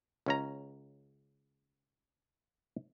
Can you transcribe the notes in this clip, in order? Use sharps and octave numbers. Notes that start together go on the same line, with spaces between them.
C#2 C#4 A#5